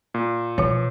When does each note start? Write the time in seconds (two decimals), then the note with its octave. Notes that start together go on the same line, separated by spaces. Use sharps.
0.14 A#2
0.58 B2 F3 C#5